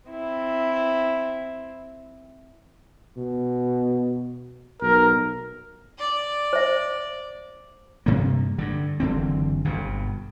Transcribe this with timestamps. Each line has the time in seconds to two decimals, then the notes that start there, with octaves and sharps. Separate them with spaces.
0.10 C4 E4
3.17 B2
4.82 B1 A#4
6.00 D5
6.53 C5 E5
8.06 G2 C3 A#3
8.58 G2 D3
9.00 F#1 D3 E3 C4
9.65 G1 G2 B2